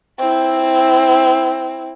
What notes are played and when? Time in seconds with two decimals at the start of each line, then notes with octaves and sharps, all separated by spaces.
0.19 C4 E4